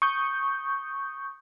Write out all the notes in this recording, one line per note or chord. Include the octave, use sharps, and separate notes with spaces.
C#6 D#6 G6